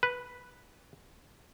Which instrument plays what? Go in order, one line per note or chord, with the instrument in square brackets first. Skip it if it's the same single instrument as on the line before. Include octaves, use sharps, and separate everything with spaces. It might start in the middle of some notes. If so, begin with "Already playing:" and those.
[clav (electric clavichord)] B4